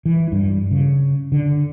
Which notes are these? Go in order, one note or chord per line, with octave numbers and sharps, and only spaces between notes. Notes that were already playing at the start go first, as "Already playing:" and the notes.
E3
G2
C#3
D3